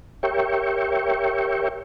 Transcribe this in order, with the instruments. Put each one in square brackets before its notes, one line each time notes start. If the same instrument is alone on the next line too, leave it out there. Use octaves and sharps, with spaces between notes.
[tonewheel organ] G4 A#4 C#5 E5 G5 C#6